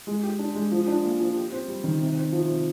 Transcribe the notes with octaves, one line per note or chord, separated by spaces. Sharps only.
G#3
G4
D4
G#3
F3
D4
A#3
F3
G4
C4
G3
D#3
C3
C4
F3
C3